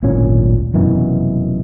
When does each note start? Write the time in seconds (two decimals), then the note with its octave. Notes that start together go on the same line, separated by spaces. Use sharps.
0.03 D1 G#1 A#2 C#4
0.74 F1 F#2 B2 E3